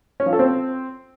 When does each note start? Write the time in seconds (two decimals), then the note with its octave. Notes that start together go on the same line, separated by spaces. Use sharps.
0.20 C#4
0.26 F3
0.33 A4
0.39 C4